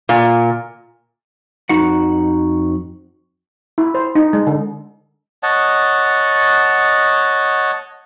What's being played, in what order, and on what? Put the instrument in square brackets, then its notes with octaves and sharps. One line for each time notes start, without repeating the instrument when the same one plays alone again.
[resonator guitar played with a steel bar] A#2
[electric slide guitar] F2 D#4 F#4 F#5
[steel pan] E4
C5
D#4
G#3
D3
[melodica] C#5 D#5 F#5 A5